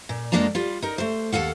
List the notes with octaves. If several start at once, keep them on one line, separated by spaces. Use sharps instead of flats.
A#2
F2 F3 G#3 A#3 D4 A#5
G3 F4
D#4 A#4
A3 C5
D#2 A4 F5 F#5